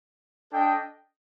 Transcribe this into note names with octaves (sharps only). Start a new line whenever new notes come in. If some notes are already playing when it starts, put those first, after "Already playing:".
D4 A4 D#5 G5